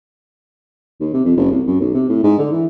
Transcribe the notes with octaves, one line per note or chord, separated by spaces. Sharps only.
D#2
C3
F2
F#1
C2
F#2
B1
C3
A2
G#2
D3
E3